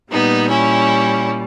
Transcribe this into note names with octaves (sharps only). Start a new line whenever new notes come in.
A#2 G3 B3 D#4
C#4 E4